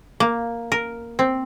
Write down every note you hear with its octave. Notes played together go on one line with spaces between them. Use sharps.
A#3
A#4
C4